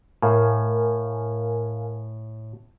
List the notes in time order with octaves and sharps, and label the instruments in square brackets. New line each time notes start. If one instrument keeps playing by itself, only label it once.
[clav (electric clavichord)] A2 [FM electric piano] A#4 F5 G#5